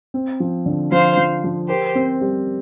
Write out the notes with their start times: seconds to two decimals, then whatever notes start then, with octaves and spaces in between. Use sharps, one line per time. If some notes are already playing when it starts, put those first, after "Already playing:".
0.14 C4
0.40 F3
0.66 D3
0.92 F3 C5 F5
1.17 F3
1.44 F3
1.69 G4 A#4 C5
1.95 C4
2.21 G3